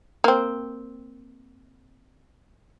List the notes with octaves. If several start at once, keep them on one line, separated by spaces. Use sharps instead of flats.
A#3 C4